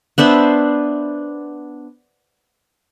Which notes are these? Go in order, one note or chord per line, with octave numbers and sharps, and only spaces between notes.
B3 D4 C5 E5